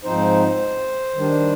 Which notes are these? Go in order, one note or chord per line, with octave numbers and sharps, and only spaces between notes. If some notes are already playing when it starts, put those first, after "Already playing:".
G#2 F3 C4 D#4 C5
D#3 G3 D4